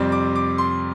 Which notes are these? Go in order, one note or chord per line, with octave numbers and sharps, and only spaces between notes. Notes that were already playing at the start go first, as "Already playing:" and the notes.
Already playing: F2 C3 G3 C4 D5
D6
D6
C6